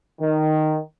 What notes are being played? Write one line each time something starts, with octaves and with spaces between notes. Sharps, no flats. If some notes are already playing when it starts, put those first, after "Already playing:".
D#3